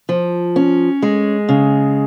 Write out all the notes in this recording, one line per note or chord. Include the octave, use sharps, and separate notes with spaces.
F3
C#4
G#3
C#3